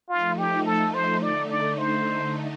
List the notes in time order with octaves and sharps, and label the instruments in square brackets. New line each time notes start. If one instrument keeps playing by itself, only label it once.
[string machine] F3 A3 D#4 [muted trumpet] F4
[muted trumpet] G4
A4
C5
[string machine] D3 A3 D#4 [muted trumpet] D5
[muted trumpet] D5
C5